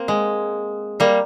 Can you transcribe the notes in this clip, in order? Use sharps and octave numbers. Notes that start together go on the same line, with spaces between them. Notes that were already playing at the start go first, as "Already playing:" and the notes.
Already playing: A#3 C4
G#3
G3 A#3